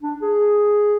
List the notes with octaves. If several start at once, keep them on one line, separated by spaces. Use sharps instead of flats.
D4
G#4